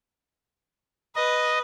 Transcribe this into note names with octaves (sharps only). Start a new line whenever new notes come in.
B4 D#5